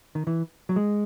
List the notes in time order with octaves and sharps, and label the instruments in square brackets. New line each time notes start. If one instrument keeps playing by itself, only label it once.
[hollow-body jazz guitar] D#3
E3
F#3
G#3